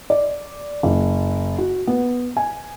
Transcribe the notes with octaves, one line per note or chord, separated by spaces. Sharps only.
D5
F#1
F#4
B3
G#5